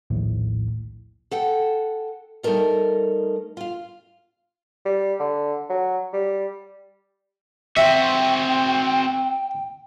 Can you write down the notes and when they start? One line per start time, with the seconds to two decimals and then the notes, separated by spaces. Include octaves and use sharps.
0.10 A#1 D#2 A2
1.31 A4 F#5 G5
2.43 G3 A3 D#4 A4 A#4 D#5
3.57 F4 F5
4.85 G3
5.20 D3
5.70 F#3
6.13 G3
7.77 C4 F#4 E5 G5